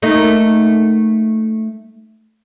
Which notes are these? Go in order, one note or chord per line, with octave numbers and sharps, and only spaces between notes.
A3 A#3 D#4